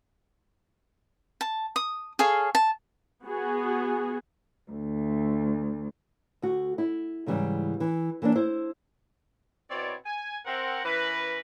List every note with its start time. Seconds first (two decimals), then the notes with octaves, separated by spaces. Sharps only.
1.41 A5
1.76 D#6
2.19 G#4 A4 C#5 F5
2.55 A5
3.24 B3 F#4 G#4
4.71 D2
6.42 D2 F#4
6.78 E4
7.26 G#2 C#3 E3 G3
7.80 E3
8.22 E3 A#3 C#4 D4
8.36 E4 C5
9.70 B2 C4 E4 C#5 D5
10.06 G#5
10.46 C4 A#4 F#5
10.85 E3 C#4 A#4 B4